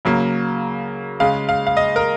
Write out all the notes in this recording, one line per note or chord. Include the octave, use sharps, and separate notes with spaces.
C#3 F#3 A#3
C#3 G#3 F5
F5
F5
D#5
A#4